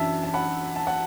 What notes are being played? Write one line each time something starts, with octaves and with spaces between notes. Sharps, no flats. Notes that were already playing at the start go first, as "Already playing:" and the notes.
Already playing: F#2 E3 D4 E5 A5
A5
F#5 B5
A5
F#5